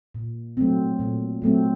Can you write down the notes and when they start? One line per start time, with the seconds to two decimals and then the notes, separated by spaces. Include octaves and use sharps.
0.15 A#2
0.57 F#3 A3 C4
1.00 A#2
1.42 F#3 A3 C4